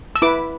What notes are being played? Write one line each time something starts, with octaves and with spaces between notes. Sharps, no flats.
E6
E4 B4 D6